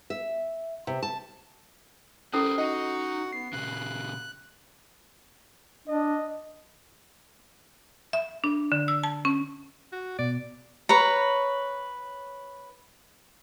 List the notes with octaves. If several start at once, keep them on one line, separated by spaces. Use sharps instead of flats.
E5
C3
A5
C#4 E4 G4 A4 A#4 C5 D#6 C7
D#4 F#4 D#5 F#5
B3 C7
A#2 C#3 F#6
D4 D#5
E5
D4
D3
E6
A5
C#4
F#4
B2 D5
B4 C#5 A#5